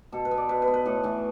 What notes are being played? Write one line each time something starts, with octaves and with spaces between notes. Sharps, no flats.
B2 A4
B4
B3
D5
B2 B4
B4
B3
B4
A2 A4
E3 A3